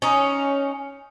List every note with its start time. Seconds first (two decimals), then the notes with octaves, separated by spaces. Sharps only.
0.02 C#4 D#4